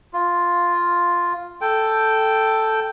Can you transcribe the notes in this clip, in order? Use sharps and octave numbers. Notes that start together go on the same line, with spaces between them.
F4
A4 G5